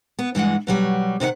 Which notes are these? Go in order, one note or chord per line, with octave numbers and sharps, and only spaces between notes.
B3
G2 E3 G#3 F#5
B2 F#3 G3
C3 D#3 D#5 F#5